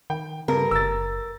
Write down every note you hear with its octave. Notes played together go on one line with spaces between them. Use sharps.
D#3 G5
G2 C#3 A#4
F#1 E6 A6